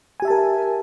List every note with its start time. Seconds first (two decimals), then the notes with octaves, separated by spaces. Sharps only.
0.20 G#5
0.22 G4
0.25 E5
0.28 A5
0.30 A#4